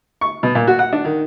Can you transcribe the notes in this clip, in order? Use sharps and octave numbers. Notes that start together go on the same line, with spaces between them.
C#6
B2
A#2
F#4
F#5
D4
D#3